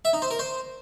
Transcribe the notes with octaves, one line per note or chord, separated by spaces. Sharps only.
E5
D#4
C5
A#4
C5